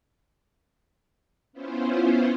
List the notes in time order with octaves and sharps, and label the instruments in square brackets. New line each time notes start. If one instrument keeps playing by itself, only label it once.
[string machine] B3 C#4 E4 F4 C5